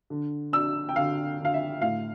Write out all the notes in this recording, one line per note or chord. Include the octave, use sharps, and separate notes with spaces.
D3
D4 E6
G5
D3 F5
D3
F5
E5
A2 F5